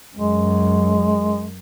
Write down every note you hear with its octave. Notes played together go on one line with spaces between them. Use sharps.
F#2 G#3